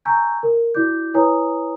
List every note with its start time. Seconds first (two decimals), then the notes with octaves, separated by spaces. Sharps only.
0.05 G#5 A#5 C#6 E6 G6 G#6
0.43 A#4
0.75 E4 F#4 D5 D6 G6
1.14 E4 B4 C#5 G#5 A#5 D#6